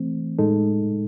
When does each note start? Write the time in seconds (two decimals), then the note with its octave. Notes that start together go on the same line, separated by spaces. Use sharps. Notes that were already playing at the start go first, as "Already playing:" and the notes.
Already playing: E3 A3 C4
0.39 A2 G#3 D#4 A4